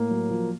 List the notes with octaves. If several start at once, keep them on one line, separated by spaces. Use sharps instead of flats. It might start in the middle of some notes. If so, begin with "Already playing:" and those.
Already playing: A2 A#3
F#3
F3